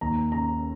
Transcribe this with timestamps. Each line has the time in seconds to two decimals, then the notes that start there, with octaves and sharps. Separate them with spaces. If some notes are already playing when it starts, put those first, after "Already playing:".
0.01 D#2 A#5
0.32 C#3 A#5